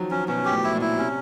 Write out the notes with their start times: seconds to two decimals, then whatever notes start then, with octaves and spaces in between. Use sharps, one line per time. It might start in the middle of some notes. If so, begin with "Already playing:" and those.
Already playing: D#3 F3 F#3
0.11 F3 C#4
0.28 B2 C#4
0.45 G4
0.52 A2
0.64 E4
0.75 A#2
0.81 E4
0.98 C3 C#4